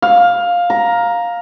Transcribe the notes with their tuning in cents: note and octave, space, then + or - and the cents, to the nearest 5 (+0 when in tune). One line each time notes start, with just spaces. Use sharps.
F5 +10
A#5 +10